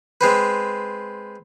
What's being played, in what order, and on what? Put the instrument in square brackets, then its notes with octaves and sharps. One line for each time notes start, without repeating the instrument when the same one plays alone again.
[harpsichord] G#3 C4 B4